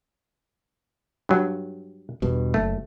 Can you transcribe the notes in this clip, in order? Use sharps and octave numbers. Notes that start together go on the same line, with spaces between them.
G2 F#3
E2 G2 B2
F#1 A3